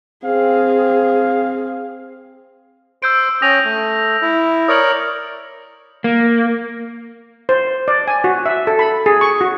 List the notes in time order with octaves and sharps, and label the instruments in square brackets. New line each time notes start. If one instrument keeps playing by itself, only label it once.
[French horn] C4 [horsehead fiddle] G#4 [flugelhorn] F5
[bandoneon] C5 C6 [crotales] E6 G6 D7
[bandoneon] C#4 G5 G#5 [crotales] D#6 A#6 F7
[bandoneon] A3
E4
[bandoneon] A#4 C#5 D5 [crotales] D#6 F#7
[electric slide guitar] A#3
[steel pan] C5
D5
G#5
F#4
E5
A4
B5
G#4
C#6
F#4